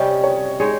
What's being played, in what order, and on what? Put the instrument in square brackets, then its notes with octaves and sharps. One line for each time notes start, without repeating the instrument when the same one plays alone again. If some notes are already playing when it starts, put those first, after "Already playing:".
Already playing: [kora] C3 G3 C#4 G4 [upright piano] D#5
[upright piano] C#5
[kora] G#3 D#4 G#4 C#5